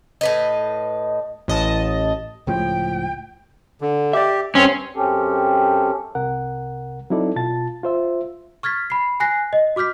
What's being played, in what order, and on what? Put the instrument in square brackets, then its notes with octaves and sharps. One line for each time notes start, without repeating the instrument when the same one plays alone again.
[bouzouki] A2 B4 D#5
[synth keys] A1 D#5 A5
[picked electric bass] C#2 A2 F3 [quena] G5
[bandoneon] D3
[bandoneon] G4 [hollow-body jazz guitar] D5 E5
[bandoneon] G2 C4 C6 [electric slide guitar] C#4
[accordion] F#2 C4 C#4 G4 A4
[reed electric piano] C2 C3 A#4 F#5
F#3 C4 D#4 E4 A4 D5
B2 F4 A5 A6
F4 C5 E5
[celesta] C#6 F6 G#6 A6 B6
B5 C7
G#5 F#6 A#6 C7
D#5
F#4 D6 F6 G6 B6